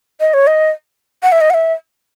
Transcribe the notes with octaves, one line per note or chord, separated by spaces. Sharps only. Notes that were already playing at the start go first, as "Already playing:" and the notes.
D#5
C#5
D#5
F#5
E5
D#5
F#5
E5